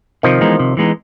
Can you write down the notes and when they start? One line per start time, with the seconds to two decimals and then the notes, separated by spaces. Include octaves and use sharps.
0.23 C3 D#3 F3
0.41 E3 G#3 B3 D#4
0.59 C3
0.77 E3 G#3 B3 D#4